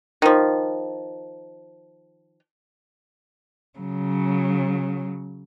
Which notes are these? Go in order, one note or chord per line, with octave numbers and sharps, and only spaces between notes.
D#3 F3
C#3 F#3